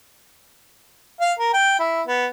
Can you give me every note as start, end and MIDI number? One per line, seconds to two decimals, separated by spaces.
1.21 1.33 77
1.39 1.51 70
1.53 1.79 79
1.79 2.02 64
2.07 2.27 59